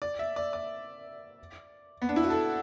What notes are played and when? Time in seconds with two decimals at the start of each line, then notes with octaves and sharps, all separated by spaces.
0.02 D5
0.19 E5
0.36 D5
0.53 D5
2.02 B3
2.09 D4
2.16 E4
2.23 F#4
2.30 A4